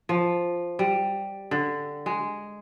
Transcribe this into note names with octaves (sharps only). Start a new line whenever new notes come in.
F3
G3
D3
G#3